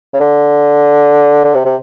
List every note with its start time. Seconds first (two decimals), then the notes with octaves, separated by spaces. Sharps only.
0.13 C#3
0.20 D3
1.44 D3
1.54 C3
1.65 C3